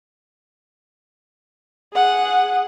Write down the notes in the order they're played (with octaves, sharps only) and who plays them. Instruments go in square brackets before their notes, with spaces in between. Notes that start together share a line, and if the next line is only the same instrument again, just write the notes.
[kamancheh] G#4 F#5